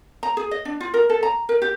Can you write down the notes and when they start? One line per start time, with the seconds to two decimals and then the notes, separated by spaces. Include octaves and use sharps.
0.23 A#5
0.37 G#4
0.51 D#5
0.65 D4
0.80 F4
0.94 A#4
1.09 A4
1.23 A#5
1.49 A#4
1.62 G4